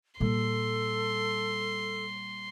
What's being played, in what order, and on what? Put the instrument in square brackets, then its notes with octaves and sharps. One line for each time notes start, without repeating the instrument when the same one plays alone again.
[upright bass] A#2 G3 [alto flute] A4 [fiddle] C6